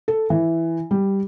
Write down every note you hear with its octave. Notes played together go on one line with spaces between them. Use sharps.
A4
E3
G3